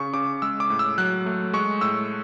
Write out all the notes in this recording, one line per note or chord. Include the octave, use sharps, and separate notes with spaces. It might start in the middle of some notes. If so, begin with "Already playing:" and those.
Already playing: C#3 C#6
C#3 D6
G#3 E6
D6
A2
E6
F#3 F#6
A3
G#3 C#6
A2 E6